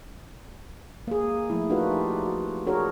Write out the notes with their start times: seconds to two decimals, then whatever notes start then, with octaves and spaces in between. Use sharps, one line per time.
1.07 A#3 G#4
1.50 F3 A3 A#3 E4
1.70 D4 D#4 F4 F#4 A#4 B4
1.91 G4
2.26 F#4
2.67 D4 F#4 G#4 A#4 C#5